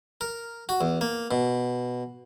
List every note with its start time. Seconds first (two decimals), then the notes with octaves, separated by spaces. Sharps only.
0.21 A#4
0.69 F#4
0.81 E2
1.01 A#3
1.31 B2